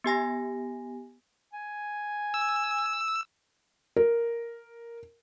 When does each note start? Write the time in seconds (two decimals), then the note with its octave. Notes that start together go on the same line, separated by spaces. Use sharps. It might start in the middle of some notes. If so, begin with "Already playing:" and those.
0.04 B3 G4 G#5 A#6
1.53 G#5
2.34 E6
3.96 A#4